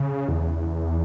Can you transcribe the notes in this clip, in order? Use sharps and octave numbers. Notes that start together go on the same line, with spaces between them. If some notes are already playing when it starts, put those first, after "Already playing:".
Already playing: C#3
E2